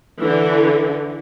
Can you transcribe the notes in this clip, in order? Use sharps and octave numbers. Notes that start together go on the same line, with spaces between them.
D3 E3